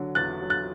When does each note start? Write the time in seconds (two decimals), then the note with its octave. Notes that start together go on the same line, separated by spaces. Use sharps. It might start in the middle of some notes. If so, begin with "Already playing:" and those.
Already playing: D3 F#3
0.15 E2 F#6 A6
0.42 F#3
0.50 F#6 A6